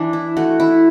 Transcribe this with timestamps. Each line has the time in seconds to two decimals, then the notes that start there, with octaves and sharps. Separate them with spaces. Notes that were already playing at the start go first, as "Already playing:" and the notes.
Already playing: E3 D4
0.13 E4
0.37 A3 F#4
0.60 E4